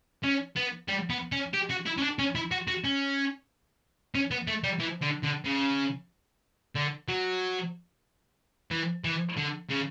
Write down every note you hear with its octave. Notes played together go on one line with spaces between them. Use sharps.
C#4
B3
G3
B3
C#4
G4
F#4
E4
C#4
D4
C#4
E4
F#4
F#4
C#4
C#4
B3
A3
G3
E3
D3
D3
C#3
D3
F#3
E3
E3
D3
C#3